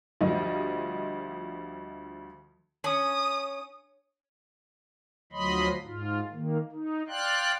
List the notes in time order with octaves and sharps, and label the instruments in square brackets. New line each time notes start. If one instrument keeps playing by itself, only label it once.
[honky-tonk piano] D2 F3 G3 D#5
[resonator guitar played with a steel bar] C#4 [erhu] D#6
[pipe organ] D2 F3 F#3 D#5 B5 C6
G#2 F4
D#3 A#3
D#4
D5 F5 G5 C6 F#6